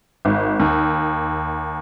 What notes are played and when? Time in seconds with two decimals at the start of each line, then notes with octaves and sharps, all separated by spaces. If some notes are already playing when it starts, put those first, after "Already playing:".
0.25 G#1
0.59 D#2